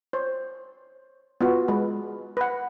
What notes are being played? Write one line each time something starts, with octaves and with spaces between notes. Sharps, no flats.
C5 C#5
B3 F4 F#4
G#3 B4
B4 F#5